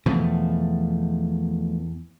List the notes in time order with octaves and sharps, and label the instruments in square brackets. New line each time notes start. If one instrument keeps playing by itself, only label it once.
[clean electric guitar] E2 [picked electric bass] B2 F3 A3